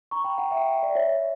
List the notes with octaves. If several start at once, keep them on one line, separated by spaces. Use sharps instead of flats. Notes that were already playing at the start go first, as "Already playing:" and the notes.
A#5 C#6
G5 B5
F#5 A#5
E5 G5
E5
D5
C#5 E5